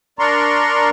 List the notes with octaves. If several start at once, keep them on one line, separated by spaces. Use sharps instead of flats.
D4 A#4 D5 A#5 C6 C#6